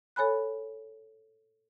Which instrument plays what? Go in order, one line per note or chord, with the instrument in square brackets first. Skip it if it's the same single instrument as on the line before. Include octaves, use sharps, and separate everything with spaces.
[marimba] A4 C#5 G#5 B5 F#6